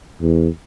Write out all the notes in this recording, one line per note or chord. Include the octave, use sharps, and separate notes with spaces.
E2